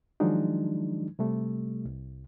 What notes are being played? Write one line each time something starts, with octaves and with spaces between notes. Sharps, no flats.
D#3 F3 F#3 G#3 D4 D#4
C3 G3 A3
C2